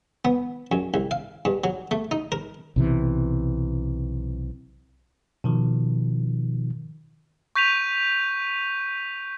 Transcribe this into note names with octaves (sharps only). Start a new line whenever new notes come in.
B3
F#2
C2
F5
G2
F#3
A3
D#4
A#4
B1 C3 E3
B2 D#3 F3
C#6 G6 B6 D#7 F7